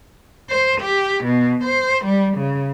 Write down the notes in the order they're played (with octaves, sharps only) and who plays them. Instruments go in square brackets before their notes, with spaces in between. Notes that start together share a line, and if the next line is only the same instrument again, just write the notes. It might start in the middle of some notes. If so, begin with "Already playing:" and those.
[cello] C5
G4
B2
C5
G3
C#3